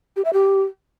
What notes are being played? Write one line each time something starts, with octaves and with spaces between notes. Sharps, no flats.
G4
E5
G4